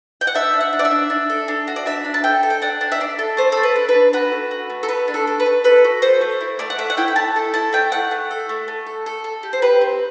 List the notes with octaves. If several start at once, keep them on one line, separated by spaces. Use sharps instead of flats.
G5
F#5
D4 E5
D4
F#5
D4
D5
E5
D4
D4
A4
D4
F#4
D5
D4 E5
D4
A5
A4 G5
A4
G5
D4 F#5
D4
E5
D4 D5
A4
A3 C5
A3 A4
B4
D4
B4
D4
F#4 B4
A3
F#4
A3
A4
A3 B4
D4
A4
A4
B4
A3
A4 B4
F#4
A4 C5
A3
E4
A3 D5
F#5
A3 E5
F#5
E4 G5
G5
A3 A5
A4
E4 A5
A3 G5
A3 F#5
A3
A4
A3
A3
A4
A4
A4
G4
C5
G4 B4
C4